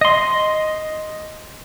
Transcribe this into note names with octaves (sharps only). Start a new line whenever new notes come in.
D#5 C6